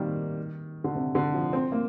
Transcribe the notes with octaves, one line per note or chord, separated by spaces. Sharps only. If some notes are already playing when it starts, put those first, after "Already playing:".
Already playing: D#3 G3 A#3 C4
D3
C3
D3
F3
C4
A#3